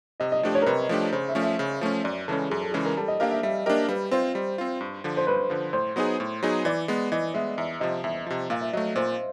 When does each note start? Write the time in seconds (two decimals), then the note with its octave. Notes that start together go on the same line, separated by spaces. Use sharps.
0.20 C3 D#5
0.32 D#5
0.43 F3 A3 D4 G4
0.55 C#5
0.62 A#4
0.66 C3 B4
0.89 F3 A3 D4 G4
1.12 C#3 C5
1.28 E5
1.35 F3 A3 C#4
1.43 E5
1.59 C#3
1.81 F3 A3 C#4
2.04 F#2 D5
2.28 C#3 E3 G#3 C#4 A4
2.50 F#2 G#4
2.61 A4
2.71 C#3 E3 G#3 C#4 G#4
2.86 A#4
2.97 G3 A4
3.08 D#5
3.20 A#3 D4 G4 A#4 F5
3.31 E5
3.43 G3 E5
3.66 A#3 D4 G4 A#4 D#5
3.89 G3 B4
4.11 C4 F4 C5
4.35 G3
4.58 C4 F4
4.81 G2
5.04 D3 F3
5.17 C5
5.27 G2 B4
5.50 D3 F3
5.73 A2 C5
5.96 F#3 B3 D#4 G#4
6.20 A2
6.43 F#3 B3 D#4 G#4
6.65 E3 D5
6.88 G#3 B3
7.12 E3 D#5
7.34 G#3 B3 E5
7.58 E2 E5
7.80 C3 F3 D#5
8.04 E2 E5
8.26 C3 F3
8.50 A#2 F5
8.61 E5
8.73 F#3 A3 D#5
8.84 D#5
8.96 A#2 C5